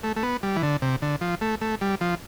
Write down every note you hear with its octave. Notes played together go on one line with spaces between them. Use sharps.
A3
A3
B3
G3
E3
D3
C3
D3
F3
A3
A3
G3
F3